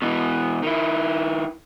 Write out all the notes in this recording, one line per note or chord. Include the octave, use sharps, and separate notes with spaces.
B2 E3
D#3 E4